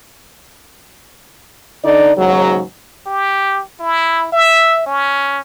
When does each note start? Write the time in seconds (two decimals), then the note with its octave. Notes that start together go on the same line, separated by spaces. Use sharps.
1.84 D3 D#4 D5
2.17 D#2 G#2 C#3 F#3
3.06 G4
3.80 E4
4.32 E5
4.86 C#4